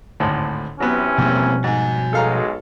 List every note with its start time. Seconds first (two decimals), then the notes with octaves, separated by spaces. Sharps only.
0.20 G#1 D2 A2
0.80 C3 E3 F#3 B3 C#4
1.18 E2 B2 F3 G3 A#3 C4
1.64 G#2 F#4 G#5
2.13 B1 G#3 A4 F5 A#5